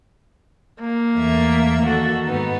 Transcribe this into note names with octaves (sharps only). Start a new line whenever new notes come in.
A#3
E2 A3 E5
D#3 F#4 A4
G#2 B3 D#4